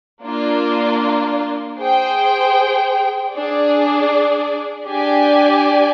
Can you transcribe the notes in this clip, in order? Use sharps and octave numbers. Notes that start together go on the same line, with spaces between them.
A#3 D4 F4
G#4 C5 G5
D4 G#4 D5
D4 G4 D5 G#5